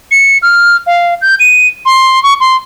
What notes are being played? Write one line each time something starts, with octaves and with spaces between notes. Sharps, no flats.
C#7
F6
F5
G6
D#7
C6
C#6
C6